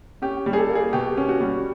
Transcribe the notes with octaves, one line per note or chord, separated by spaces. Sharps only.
C#4 G4
G3
G#4
A4
A#3
G#4
B2 G4
C#4
F#4
G3